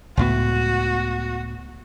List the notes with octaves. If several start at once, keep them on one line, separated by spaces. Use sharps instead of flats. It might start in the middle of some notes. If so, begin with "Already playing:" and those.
C#2 A2 B3 F#4